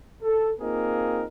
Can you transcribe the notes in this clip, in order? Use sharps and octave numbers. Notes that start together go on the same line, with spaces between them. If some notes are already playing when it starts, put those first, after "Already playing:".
A4
A#3 C4 D#4 F4 G#4 A#4